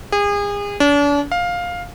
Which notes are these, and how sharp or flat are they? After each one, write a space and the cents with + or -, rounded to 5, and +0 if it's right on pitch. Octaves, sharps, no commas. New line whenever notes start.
G#4 -35
D4 -40
F5 +10